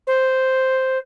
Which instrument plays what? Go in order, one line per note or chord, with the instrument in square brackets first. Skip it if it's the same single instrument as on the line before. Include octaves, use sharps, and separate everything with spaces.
[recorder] C5